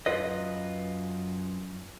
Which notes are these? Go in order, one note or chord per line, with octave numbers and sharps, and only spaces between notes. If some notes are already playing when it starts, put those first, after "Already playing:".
F#2 F4 B4 D#5